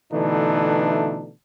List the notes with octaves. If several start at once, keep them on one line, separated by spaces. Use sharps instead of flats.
B2 D3 E3 A3 D4 D#4